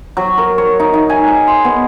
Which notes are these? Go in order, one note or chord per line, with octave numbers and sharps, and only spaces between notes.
F#3
A#4
C#5
D#4
D#4
G#5
G#4
C6
B3